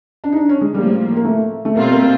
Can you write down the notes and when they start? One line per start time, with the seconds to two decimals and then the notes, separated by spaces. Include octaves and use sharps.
0.24 D4
0.32 D#4
0.36 D4
0.49 C#4
0.61 G#3
0.74 A2 F3 G3 A#3
1.16 A#3
1.25 A3
1.65 A3
1.75 B2 G3 A#3 C4 F4
1.92 A#3